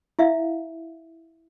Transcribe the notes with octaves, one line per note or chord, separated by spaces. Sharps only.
E4 E5 F5